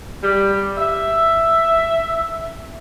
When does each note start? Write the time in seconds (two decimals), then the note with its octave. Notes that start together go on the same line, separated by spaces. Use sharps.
0.23 G3
0.78 E5